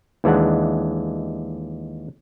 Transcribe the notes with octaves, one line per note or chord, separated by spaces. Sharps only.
D#2 E3 G#3 D4 F#5